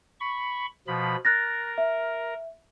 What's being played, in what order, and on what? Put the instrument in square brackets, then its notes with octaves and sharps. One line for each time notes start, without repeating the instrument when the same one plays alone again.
[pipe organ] B5 C#6
B2 F3 B5
[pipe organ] A#4 [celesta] F#6 A6 A#6
[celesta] E5